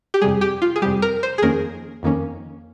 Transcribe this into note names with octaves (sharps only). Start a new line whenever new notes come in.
G4
F2 C3 G3 G#4
G4
F4
G#4
F2 C3 G3 G4
A#4
C5
G#4
F2 D#3 A#3 C#4 A#4
F2 D#3 A#3 C#4